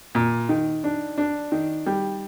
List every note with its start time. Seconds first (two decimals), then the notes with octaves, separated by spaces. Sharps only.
0.15 A#2
0.49 D#3
0.84 D4
1.18 D4
1.52 D#3
1.86 G3